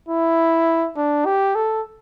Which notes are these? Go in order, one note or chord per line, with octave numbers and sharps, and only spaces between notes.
E4
D4
G4
A4